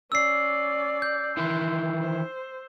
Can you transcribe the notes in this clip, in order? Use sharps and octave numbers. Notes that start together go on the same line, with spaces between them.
C#4 D5 E6 C7
G6
D#3 E3 E4 C6
C5